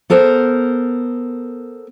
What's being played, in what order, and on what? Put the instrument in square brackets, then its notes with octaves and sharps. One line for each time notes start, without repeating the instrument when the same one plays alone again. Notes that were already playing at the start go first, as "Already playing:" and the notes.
[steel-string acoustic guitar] B3 A4 A#4 C5